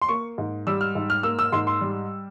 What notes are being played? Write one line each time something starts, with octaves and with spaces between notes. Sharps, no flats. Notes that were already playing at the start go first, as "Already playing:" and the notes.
C6
A#3 C#6
G#2
G3 E6
F6
G#2
F6
A#3 E6
E6
G#2 C6
C6
G3